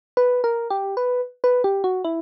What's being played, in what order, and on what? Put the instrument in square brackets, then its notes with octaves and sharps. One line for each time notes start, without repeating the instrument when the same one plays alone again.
[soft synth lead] B4
A#4
G4
B4
B4
G4
F#4
E4